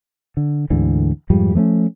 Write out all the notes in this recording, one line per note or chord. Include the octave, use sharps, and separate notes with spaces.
D3
D2 G#2 D3 E3
F2 G#2 F3 G3
F3 A3 B3 C#4